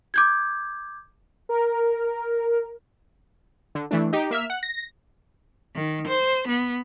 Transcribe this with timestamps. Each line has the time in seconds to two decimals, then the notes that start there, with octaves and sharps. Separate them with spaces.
0.14 D6 G6 G#6
1.49 A#4
3.75 D3
3.91 E3 A3 D4
4.13 D#4 G4
4.31 A#3 E5 F6
4.50 F#5
4.63 A#6
5.75 D#3
6.07 C5
6.48 B3